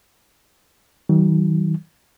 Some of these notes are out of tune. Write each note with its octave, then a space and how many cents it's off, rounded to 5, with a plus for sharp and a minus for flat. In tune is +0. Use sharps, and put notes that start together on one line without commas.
D#3 +40 F#3 +45